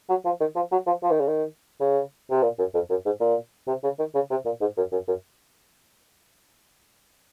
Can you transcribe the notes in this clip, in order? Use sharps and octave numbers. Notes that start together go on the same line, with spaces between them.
F#3
F3
D#3
F3
F#3
F3
F3
D#3
C#3
D#3
C#3
C3
A#2
F#2
F2
F#2
G#2
A#2
C3
C#3
D#3
C#3
C3
A#2
G#2
F#2
F#2
F#2